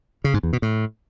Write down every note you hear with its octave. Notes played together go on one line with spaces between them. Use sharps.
C#3
G#2
E2
B2
A2